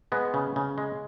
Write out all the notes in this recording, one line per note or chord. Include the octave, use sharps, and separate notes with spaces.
G#3 B3
C#3
C#3
G#3